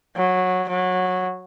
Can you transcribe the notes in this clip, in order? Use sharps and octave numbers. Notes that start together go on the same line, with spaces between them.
F#3
F#3